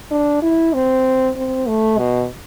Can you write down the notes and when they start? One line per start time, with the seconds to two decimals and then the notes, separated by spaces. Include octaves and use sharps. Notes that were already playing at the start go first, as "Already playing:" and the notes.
0.11 D4
0.42 E4
0.73 C4
1.36 C4
1.67 A3
1.98 B2